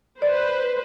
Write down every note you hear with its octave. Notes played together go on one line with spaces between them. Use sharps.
B4 C5 D5